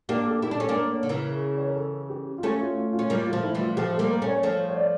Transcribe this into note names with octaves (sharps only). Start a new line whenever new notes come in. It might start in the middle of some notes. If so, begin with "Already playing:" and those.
A#3 D4 G4
A4
E4 G4
D4
C#4 A4
A#3 D4
A#4
C#5
D3
C#3 E3 A#4
C#5
A#4
A4
G4
F4
A3 C#4 G4
F4
F4
F4
C#4
G3 A#3 F4
F4
F3 A3
E4
E3 G3
F4
F3 A3 G4
A4
G3 A#3
A#4
A3 C#4
C#5
F3 A3 C#5
C#5
D5